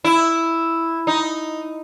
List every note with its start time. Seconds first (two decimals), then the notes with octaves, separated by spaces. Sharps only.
0.05 E4
1.07 D#4